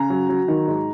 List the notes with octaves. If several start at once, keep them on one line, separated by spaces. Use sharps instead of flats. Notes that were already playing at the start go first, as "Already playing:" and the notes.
Already playing: C#3 A#5
F#3
F#3
D#3
G#2